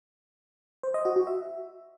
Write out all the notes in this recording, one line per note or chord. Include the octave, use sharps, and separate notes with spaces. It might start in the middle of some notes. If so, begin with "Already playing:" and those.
C5
D#5
F#4
F#4
E5